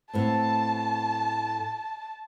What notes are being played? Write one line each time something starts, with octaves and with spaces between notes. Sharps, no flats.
A2 B3 C4 A5